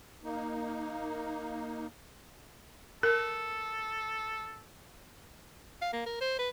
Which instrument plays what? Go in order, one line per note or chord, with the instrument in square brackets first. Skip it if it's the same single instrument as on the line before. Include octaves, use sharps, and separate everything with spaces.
[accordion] A#3 D#4
[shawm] A4 [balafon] A#4
[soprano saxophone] F5
A#3
A#4
C5
B4